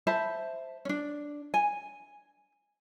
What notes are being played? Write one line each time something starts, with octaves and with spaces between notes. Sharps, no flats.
C5 E5 A5 B5
C#4 D4
G#5